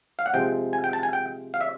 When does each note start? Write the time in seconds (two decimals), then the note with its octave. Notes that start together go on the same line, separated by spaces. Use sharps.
0.19 F5
0.26 F#5
0.34 C3 F3 G#3 G5
0.73 G#5
0.84 G5
0.93 A5
1.03 G#5
1.13 G5
1.54 F5
1.61 E5